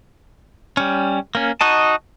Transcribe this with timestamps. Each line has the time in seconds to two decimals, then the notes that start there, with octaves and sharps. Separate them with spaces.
0.77 G3 C#4
1.35 A#3 C#4
1.61 D#4 F#4 D#5 A5